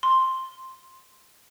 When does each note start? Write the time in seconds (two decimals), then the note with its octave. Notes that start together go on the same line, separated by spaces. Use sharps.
0.03 C6